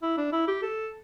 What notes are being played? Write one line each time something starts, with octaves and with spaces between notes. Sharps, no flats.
E4
D4
E4
G4
A4